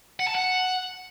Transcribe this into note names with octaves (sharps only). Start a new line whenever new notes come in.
F#5
A5
F#5